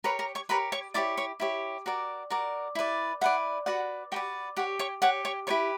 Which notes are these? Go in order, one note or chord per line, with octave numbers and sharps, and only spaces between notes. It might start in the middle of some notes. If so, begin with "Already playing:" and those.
G4 A#4 B4 C#5 B5
A#4 A#5
C#5 C#6
G4 A#4 B4 C#5 B5
C#5 C#6
E4 G4 C#5 D5 D6
C#5 C#6
E4 G4 C#5
F#4 A#4 D5
F#4 A#4 D5
E4 B4 D5
E4 B4 D5 F#5
F#4 B4 D5 F#5
F#4 G4 B4 D5 G5
G4 C#5 F#5
C#5 C#6
G4 C#5 F#5
C#5 C#6
E4 G4 B4 C#5 D5 C#6